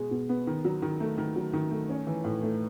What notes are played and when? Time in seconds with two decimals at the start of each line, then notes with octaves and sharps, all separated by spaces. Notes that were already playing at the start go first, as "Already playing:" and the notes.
Already playing: B2 G#3
0.11 B2
0.29 B3
0.47 D#3
0.65 F#3
0.82 D#3
1.00 A3
1.18 D#3
1.36 F#3
1.53 D#3
1.71 A3
1.89 C#4
2.07 E3
2.24 A2
2.43 A3